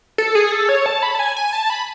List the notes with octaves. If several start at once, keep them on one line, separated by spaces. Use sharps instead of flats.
A4
G#4
A4
C#5
A5
B5
A5
G#5
G#5
A5
B5